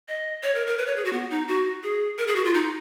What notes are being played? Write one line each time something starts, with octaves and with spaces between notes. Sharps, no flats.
D#5
C#5
A#4
A#4
B4
C#5
G#4
F#4
B3
D#4
F#4
G#4
A#4
G#4
F#4
F4
D#4